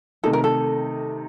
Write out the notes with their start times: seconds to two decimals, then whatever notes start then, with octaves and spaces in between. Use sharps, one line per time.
0.23 C3 D#3 A3 D#4 A4
0.33 A#4
0.44 A4